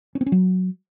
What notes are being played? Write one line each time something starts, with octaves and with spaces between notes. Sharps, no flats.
C#4
C4
C#4
F#3